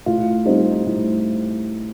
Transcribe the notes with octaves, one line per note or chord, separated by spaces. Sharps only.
A2 F4
G3 C4 D#4
A2